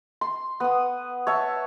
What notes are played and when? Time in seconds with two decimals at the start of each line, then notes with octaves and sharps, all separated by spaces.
0.21 C6
0.60 B3 D#6
1.27 C#5 E5 A5